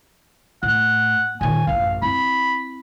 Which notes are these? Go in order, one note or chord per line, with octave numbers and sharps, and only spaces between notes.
A2 F#5
A#2 D#3 G#5
A1 F#2 F5
C4 E4 B5